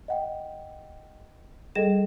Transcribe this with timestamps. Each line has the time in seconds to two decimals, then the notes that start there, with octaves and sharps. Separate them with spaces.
0.08 D#5 F#5 G5
1.75 G3 G#4 A4 D#5 E7